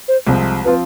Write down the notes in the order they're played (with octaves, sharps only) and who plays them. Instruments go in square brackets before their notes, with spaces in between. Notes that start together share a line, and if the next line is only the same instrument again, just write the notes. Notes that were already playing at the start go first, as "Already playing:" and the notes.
[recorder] C5
[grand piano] C2 C3 F3 G#3 C4
[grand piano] F3 C4 F4 [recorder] B4